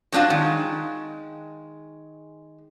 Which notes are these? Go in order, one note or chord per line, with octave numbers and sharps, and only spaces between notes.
F#3 C4 D4 F4 F#4
D#3 G#3